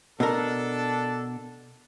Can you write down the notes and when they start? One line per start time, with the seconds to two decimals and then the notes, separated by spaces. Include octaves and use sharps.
0.20 B2 D4 A4 A#4